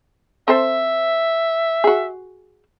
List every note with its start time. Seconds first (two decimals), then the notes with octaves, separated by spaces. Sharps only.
0.48 C4 A4 C5 E5
1.84 F#4 G#4